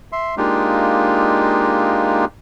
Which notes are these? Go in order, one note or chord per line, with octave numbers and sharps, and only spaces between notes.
E5 C6
G#3 A#3 D4 D#4 F4 G4